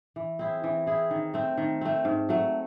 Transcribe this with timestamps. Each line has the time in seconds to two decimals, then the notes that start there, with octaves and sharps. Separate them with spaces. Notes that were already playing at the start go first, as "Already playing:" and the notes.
0.16 E3
0.39 C4 E4 G#4
0.64 E3
0.86 C4 E4 G#4
1.11 D#3
1.34 A3 C4
1.57 D#3
1.81 A3 C4
2.05 G#2
2.29 F#3 A3